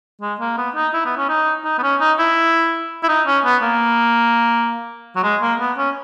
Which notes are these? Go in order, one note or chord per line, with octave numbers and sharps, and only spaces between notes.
G#3
A#3
B3
D#4
E4
B3
C#4
D#4
D#4
B3
C#4
D#4
E4
E4
D#4
C#4
B3
A#3
F#3
G#3
A#3
B3
C#4